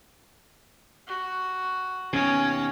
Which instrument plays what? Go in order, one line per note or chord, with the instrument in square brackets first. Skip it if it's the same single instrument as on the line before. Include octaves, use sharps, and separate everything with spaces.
[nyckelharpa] F#4
[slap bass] D#2 B2 [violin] C#4